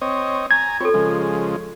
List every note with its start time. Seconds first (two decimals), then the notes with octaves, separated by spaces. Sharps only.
0.01 C4 C#5 D#5
0.51 G#5 A#5 G#6
0.80 C4 F4 A4 C#5
0.94 C#3 F3 G#3